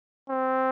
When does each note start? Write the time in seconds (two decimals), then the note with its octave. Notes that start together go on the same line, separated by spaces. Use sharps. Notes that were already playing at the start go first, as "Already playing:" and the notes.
0.30 C4